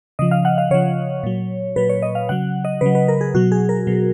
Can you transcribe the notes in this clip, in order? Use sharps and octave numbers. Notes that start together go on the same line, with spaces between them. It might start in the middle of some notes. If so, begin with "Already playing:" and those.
C#3 F3 D#5
F5
F#5
F5
C#3 F3 C#5
A#2 F#3
A#2 F#3 B4
C#5
D#5
F5
C#3 F#3 F#5
D#5
C#3 F#3 B4
B4
A#4
G#4
B2 F#3 F#4
G#4
A#4
B2 F#3